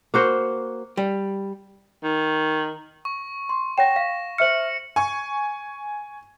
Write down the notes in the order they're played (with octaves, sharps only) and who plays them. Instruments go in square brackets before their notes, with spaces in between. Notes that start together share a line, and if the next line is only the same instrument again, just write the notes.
[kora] A#3 F#4 C5
[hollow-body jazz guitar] G3
[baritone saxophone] D#3
[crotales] C#6
[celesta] C6
[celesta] C#5 F#5 G5 [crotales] A#6 E7
[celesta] F5
[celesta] C5 E5 F6 [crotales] C#7 F#7
[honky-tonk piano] G#5 C#6